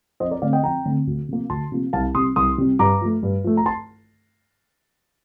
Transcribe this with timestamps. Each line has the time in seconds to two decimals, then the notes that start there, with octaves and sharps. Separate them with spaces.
0.20 F2 C5 D#5
0.31 A#4 D5
0.42 D3 A3 C4 D5 F5
0.53 D#5 G5
0.64 F2 G5 A#5
0.85 D3 A3 C4
1.07 D2
1.29 C3 F3 A#3
1.50 D2 A5 C6
1.72 C3 F3 A#3
1.93 C2 F5 A5
2.15 C3 G3 C6 D#6
2.36 C2 C6 D#6
2.58 C3 G3
2.79 G2 A#5 D6
3.01 F3 A3
3.23 G2
3.44 F3 A3
3.57 A#5
3.66 A5 C6